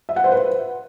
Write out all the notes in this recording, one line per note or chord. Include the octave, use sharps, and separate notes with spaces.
E5
F#5
C5
B4